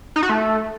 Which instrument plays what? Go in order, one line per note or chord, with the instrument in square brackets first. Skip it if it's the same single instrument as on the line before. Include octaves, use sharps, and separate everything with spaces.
[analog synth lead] D#4
F#4
A3